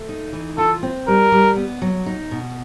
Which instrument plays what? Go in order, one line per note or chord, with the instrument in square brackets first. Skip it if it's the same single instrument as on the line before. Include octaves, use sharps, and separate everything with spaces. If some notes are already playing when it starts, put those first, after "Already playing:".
Already playing: [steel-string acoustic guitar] A3
D#4
E3
[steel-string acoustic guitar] F4 [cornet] A4
[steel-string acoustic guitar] C4
[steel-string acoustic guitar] G3 [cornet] A#4
[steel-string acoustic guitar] G3
B3
F#3
D#4
B2